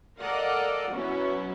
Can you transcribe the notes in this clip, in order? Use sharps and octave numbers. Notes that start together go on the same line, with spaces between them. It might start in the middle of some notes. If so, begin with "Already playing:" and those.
A4 A#4 D5 D#5 F5 F#5
B2 F#3 C#4 E4 F#4